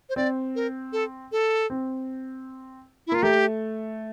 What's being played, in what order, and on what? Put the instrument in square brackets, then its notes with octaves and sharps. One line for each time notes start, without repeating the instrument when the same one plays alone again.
[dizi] C5
[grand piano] C4 [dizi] D5
[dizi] A#4
A4
A4
[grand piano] C4
[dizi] E4
[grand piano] A#3 [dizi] F4
[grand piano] A3 [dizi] G4